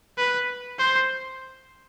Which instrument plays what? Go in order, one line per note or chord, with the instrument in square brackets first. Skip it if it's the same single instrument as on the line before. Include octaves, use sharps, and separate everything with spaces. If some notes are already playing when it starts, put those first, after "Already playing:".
[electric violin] B4
C5